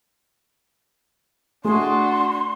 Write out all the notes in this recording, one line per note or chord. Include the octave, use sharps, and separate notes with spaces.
A3 D4 F#4 G#4 C6